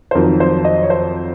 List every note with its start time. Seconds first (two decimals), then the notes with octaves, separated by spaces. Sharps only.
0.11 C5
0.15 F2 D#3 F#3 A#4
0.40 C5
0.65 D#5
0.83 C#5
0.90 C5